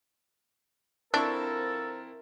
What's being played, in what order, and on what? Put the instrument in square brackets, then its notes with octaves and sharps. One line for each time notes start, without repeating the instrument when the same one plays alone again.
[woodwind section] F3 A4 [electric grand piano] C4 E4 C#6 [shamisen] D4 [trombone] A#4